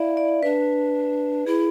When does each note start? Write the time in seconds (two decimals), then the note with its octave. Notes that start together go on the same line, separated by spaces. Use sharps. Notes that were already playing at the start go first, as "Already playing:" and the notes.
Already playing: E4 D5 E5 F5
0.17 D5
0.43 D4 B4
1.46 E4 G#4